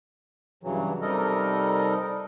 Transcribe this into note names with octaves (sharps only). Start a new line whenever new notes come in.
G2 C#3 E3 F#3
C3 G3 D#4 A4 A#4 D#5